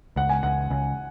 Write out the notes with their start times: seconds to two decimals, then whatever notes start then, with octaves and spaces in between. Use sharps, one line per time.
0.16 C#2 F#5
0.29 G#5
0.43 C#2 F#5
0.70 C#2